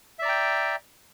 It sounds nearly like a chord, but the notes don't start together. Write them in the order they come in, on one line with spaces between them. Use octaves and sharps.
E5 D5 A#5 G5